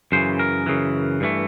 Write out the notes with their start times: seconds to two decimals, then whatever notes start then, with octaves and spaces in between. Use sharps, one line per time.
0.12 F#2 C#3 E3 C5
0.39 A#4
0.66 F#2 C#3 E3
1.21 G2 E3 A3